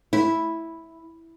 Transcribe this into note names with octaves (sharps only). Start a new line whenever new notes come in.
E4